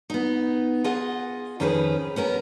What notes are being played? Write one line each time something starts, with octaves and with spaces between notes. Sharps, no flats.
B3 D#4
F4 G#4 D#5 F#5
F2 D#3 C#4 G#4 A4 B4
B3 C#4 A#4